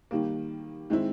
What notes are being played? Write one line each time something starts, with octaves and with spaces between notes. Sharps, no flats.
D#3 G3 A#3
D#3 G#3 C4 E4